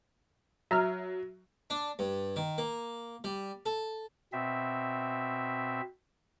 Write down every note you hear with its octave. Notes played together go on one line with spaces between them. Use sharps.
F#3 E5 A#5 F6
D4
G2
D#3
A#3
G3
A4
B2 C4 E5